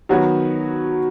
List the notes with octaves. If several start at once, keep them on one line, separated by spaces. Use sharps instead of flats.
D#3 F#3 B3 F#4 C#5